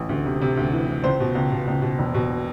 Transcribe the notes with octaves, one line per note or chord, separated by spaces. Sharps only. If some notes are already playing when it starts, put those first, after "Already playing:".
Already playing: A1
D2
C3
C3
D2
E3
E3
C#2 C5
B2
C#2
B2
C#2
B2
E1
B2